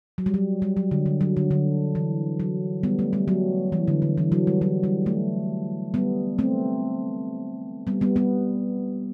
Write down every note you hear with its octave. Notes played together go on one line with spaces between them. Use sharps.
F#3
G3
F#3
G3
F#3
D3
D3
F#3
D3
D3
E3
F#3
G3 B3
A3
G3
F#3
E3
D3
D3
E3
F#3
G3
F#3
G3
A3
G3 B3
A3 C4
G3 B3
G3 B3
G3 B3